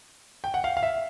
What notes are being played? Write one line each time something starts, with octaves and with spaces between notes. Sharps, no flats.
G5
F#5
F5
F5
E5